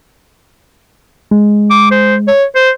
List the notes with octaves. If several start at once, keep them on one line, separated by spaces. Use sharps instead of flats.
G#3
D6
C5
C#5
C5